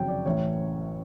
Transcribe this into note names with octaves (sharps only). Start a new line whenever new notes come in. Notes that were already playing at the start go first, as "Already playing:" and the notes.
Already playing: F#1 F2 C3 D#3 F#3 C#5 G5
D5
A1 A2 E3 C#5